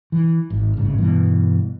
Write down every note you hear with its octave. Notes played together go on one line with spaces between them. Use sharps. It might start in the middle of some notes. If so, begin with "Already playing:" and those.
E3
G#1
D1 G#1 G2 C#3
G2 B2 E3